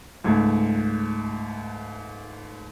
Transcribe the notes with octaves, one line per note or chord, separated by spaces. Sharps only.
C#2 G#2 A3 G#6